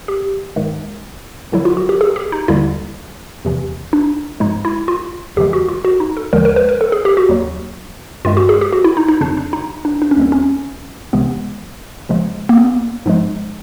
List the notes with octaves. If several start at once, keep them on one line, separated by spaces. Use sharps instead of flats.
G4
G#2 D#3 G#3
D2 D3 F#3 E4
F4
F#4
G4
G#4
G4
D#4
D#2 D3 G3 E4
E2 C3 E3
D4
G#2 F3 G#3 D#4
E4
F4
E2 C#3 E3 G#3 G4
F#4
F4
F#4
D#4
A4
D#2 D3 F3 G#3 A#4
A#4
B4
A#4
A4
G#4
G4
F#4
D#2 C#3 F#3
G2 D#3 G#3 F4
F#4
G#4
G4
F#4
E4
D#4
D#4
F2 C#3 F#3 D4
D4
D#4
D4
D4
C#4
D#2 D#3 G3 C4
C#4
C#2 C3 E3 G#3 B3
C#2 C#3 F3 G#3
A#3
B3
G#2 F3 G#3